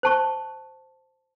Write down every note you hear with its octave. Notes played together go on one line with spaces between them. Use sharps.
C5 A5 C#6